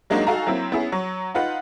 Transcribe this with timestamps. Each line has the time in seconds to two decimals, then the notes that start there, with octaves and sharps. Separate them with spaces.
0.10 F#3 G#3 A#3 D4 D#4 F#4
0.27 D#4 F#4 A4 F5 G#5 A#5
0.47 F#3 A#3 C4 E4
0.72 B3 C#4 E4 G#4
0.92 F#3 C#6
1.34 D#4 F4 B4 F#5